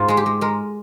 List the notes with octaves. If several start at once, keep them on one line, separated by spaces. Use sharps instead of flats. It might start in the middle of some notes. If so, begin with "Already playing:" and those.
Already playing: G#2 F4
G#3 G#4
G4
G#3
G#3 A#4